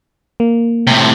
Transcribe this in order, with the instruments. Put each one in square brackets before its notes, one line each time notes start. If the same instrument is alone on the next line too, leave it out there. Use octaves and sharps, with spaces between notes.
[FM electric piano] A#3
[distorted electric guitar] A2 C3